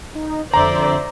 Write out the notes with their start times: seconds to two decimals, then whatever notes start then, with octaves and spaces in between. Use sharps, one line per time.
0.15 D#4
0.54 F2 D3 C5 D5 E5 A#5